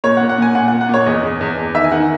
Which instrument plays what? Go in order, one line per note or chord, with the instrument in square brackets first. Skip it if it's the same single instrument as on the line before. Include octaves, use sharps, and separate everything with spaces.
[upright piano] A#2 C#5
F#5
A#2
F#5
A#2 G#5
A#2 F#5
F#5
A#2
F#5
A#2 C#5
E2 D#5
E2
E2
E2
D#3 E5
G#5
D#3 F#5